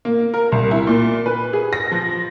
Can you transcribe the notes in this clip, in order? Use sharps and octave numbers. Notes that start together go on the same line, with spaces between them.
A#3
A#4
C2
E4
A#2
B4
G#4
A#6
F3